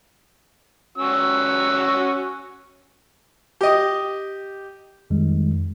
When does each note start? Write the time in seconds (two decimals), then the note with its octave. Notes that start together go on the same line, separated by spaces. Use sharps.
0.98 C#4 F#4 E6
3.61 G4 D#5
5.10 F2 D#3 G3 G#3